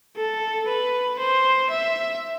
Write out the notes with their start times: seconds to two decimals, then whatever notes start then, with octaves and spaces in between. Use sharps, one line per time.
0.17 A4
0.68 B4
1.20 C5
1.71 E5